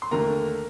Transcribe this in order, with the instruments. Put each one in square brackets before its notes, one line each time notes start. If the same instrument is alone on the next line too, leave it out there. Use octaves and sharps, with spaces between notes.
[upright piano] C6
D#2 D3 A3 A#4 A#5